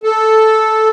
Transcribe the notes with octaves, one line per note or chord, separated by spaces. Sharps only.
A4